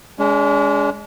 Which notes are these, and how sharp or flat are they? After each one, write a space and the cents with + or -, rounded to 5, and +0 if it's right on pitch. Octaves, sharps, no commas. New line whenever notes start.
G#3 +0 D4 -45